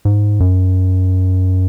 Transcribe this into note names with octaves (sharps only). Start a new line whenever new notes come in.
G#2
F#2